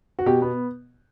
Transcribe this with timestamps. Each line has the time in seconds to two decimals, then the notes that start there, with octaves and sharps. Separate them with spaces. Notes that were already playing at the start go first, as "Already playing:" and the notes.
0.19 F#4
0.26 B2 G4
0.42 B3